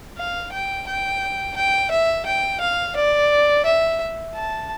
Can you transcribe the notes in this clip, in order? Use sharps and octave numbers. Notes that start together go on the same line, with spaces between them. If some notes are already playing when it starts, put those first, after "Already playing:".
F5
G5
G5
G5
E5
G5
F5
D5
E5
A5